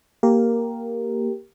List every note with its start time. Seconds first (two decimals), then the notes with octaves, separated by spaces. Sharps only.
0.23 A#3 G4 A#4